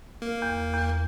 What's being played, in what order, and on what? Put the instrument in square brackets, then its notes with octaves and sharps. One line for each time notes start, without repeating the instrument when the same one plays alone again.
[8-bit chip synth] A#3
[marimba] E2
E2